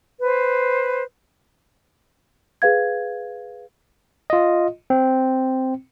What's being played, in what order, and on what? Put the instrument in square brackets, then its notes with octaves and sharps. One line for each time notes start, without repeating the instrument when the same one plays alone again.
[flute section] B4 C5
[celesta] G#4 B4 F5 G#6
[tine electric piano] F4 D#5
C4